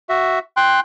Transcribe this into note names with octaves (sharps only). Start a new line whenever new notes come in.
F#4 E5
G5 C6 F#6